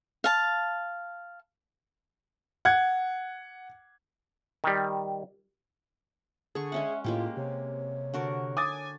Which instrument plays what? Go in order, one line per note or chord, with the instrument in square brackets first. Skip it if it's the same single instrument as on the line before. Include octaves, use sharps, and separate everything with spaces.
[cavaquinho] F5 A5
[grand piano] F#5 G#6
[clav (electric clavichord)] D#3 G3
[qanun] D3 C#6 [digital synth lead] G#4
[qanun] G#3 C#4 F#5 [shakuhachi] E5
[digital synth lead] A2 [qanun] G#3 A#3 G4 [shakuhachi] F4
[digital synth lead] C3 [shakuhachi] C#5
[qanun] D3 F#4 A#4
[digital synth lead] G#5 [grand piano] D6 D#6 A6